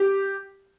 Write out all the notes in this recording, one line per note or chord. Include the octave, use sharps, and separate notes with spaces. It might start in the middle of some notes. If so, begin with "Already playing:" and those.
Already playing: G4